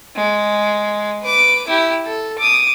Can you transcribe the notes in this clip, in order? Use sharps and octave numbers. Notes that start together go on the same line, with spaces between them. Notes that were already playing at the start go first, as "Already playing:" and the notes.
G#3
B4 D6
E4 G4
A4
D6 D#6